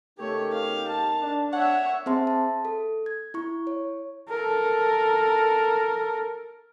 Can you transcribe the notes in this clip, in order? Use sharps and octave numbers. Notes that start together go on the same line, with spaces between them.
C#3 A3 D#4 G4 A#4 C#5
F5
F5 A5
D4
C#5 E5 F#5
C4 G#4 C5 E5 A5 C6
A5
A4
G#6
E4 C#6
C#5
A4 A#4